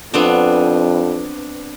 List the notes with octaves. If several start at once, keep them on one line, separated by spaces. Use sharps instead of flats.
F2 B3 C4 D4